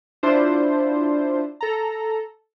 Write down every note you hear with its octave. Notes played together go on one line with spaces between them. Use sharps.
D4 E4 F4 C5
A4 A#5